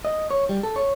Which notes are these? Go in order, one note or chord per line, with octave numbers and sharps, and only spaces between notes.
D#5
C#5
G3
A4
C#5